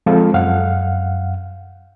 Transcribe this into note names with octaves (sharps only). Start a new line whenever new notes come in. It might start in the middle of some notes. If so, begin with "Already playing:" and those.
F3 G#3 C4 F4 A4 F5
F#2 F5 F#5